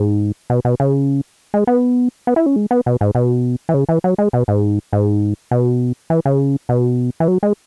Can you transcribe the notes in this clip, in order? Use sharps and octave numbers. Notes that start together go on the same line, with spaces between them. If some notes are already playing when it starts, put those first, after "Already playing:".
Already playing: G#2
B2
B2
C#3
G#3
B3
B3
E4
C#4
G#3
B3
B2
G#2
B2
E3
C#3
E3
F#3
G#3
B2
G#2
G#2
B2
E3
C#3
B2
E3
F#3
G#3